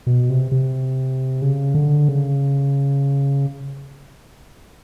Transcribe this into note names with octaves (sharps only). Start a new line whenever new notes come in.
B2
C3
C3
C#3
D3
C#3